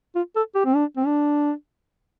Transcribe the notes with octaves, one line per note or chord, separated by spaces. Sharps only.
F4
A4
G4
C4
D4
C4
D4